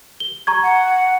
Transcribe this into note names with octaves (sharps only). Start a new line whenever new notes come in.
G7
A#5 C#6 G#6
F#5